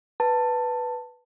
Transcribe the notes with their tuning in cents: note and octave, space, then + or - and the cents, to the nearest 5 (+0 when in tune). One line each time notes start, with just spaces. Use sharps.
B4 +0 A5 +15